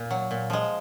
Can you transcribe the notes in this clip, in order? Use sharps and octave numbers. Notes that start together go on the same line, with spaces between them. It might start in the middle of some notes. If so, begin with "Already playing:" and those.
Already playing: A#2
F#3
A#2
F3 G#3